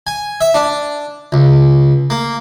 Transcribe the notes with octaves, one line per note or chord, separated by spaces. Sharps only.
G#5
E5
D4
C#2
A#3